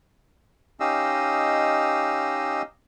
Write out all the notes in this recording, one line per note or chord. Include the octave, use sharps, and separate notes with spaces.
C#4 D#4 G4 D#5 F5 E6